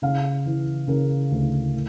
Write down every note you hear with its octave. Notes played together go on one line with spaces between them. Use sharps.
C#3 F5
E3
C#3 A#4
D2
A2